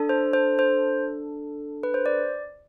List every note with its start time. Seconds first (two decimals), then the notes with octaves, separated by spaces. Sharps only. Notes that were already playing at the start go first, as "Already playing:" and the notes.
Already playing: D4 A4
0.09 C5
0.33 C5
0.59 C5
1.83 B4
1.94 C5
2.06 D5